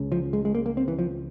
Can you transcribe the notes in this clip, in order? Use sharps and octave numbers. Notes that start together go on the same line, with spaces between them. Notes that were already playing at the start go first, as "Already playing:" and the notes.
Already playing: C#2 C#3
F3
G#3
G#3
A#3
A#3
C4
E3
F3